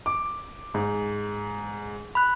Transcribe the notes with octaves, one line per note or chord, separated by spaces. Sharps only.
D6
G#2
B5 F#6